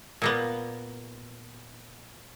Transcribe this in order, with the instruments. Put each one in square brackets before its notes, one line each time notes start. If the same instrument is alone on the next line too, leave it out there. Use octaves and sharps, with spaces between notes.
[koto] A#2 A#3 B3